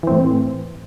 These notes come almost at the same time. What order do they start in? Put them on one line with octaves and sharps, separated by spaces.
E3 C4 A2